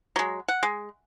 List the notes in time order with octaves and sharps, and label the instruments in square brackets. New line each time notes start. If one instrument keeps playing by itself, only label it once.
[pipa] F#3 G#3
F#5
G#3